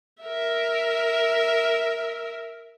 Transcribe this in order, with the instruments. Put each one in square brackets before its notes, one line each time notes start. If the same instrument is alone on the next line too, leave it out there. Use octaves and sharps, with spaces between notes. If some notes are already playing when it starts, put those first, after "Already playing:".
[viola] A#4 E5